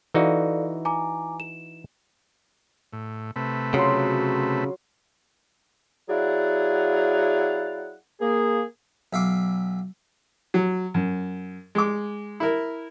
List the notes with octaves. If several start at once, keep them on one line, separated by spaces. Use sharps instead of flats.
E3 D#4 F#4 A4 D5 F5
G#5 A#5 D6
E7
A2
C3 A3 B4
C#3 F#3 F4 C6
F#3 E4 G#4 D5 F5 F#5
A#3 G#4
B1 E5 F5 D6
F#3
F#2
G#3 D6
E4 A#4